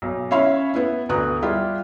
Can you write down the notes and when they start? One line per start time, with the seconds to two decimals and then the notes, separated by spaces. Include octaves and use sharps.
0.02 B1
0.31 C#4 E4 C#5 E5 F5 B5
0.74 B3 E4
1.09 D2 B3 A#5 D#6 F#6
1.42 G3 E4 F4 G4